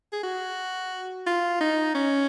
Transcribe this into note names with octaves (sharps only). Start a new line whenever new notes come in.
G#4
F#4
F4
D#4
C#4